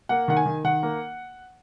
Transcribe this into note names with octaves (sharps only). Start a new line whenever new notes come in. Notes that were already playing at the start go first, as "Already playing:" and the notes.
A#3 F#5
D#3 F#5
G#5
D#3
D#3 F#5
A#3